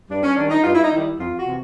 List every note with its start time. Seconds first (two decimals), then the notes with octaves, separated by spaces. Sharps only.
0.08 G2 D4
0.22 C#4
0.36 D#3 G3 D4
0.50 D#4
0.64 G2 F4
0.74 E4
0.84 D#4
0.92 D#3 G3 E4
1.19 F2 F4
1.37 F#4
1.47 C3 E3